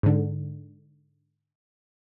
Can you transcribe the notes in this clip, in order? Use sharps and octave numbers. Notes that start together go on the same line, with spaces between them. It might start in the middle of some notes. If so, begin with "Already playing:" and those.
G#2 D3